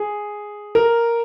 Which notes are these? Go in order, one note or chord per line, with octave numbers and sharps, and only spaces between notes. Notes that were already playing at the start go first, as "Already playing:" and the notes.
Already playing: G#4
A#4